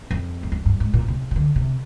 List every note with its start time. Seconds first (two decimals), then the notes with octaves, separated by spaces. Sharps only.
0.11 F2
0.43 G#2
0.52 G2
0.66 G2
0.80 G#2
0.94 A#2
1.08 C3
1.31 C3
1.36 D3
1.56 C3